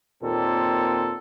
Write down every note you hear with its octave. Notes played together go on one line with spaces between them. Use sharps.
D#2 A#2 C4 A4